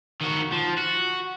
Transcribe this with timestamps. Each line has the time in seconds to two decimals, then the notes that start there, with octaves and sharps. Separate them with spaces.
0.21 D#3 F#4
0.53 F3
0.78 F#4